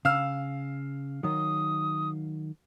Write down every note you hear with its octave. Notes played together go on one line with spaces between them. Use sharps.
C#3 F5 E6 F6
D#3 F#3 D#6